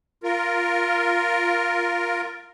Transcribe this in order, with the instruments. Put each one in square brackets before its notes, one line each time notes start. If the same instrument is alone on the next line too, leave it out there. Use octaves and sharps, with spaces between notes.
[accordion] F4 A#4